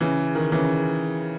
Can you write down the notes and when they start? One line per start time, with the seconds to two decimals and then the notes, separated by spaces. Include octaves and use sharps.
0.01 C#3 E3
0.35 D#3
0.52 C#3 E3